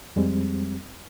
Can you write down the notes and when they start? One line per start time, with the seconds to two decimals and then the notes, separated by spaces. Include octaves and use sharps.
0.16 F2 G3 G#3 C4